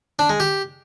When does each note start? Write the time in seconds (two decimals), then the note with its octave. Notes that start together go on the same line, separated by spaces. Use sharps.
0.19 D4
0.29 G#3
0.40 G4